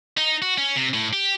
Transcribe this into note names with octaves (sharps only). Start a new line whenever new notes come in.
D#4
F#4
C#4
C3
A2
G4